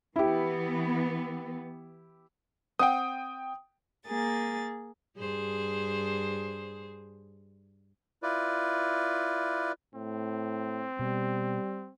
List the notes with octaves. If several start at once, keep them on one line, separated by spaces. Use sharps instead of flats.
E3 B3 E4 G4
C4 F#5 G5 D#6
A#3 G#4 A6
G2 G#4 C5
E4 F4 B4 D5
A2 C4
B2 G3